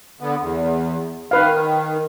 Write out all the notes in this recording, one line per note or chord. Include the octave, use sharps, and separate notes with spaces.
D3 B3
E2
D#3 B4 F5